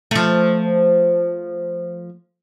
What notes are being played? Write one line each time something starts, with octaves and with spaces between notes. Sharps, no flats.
F3 A3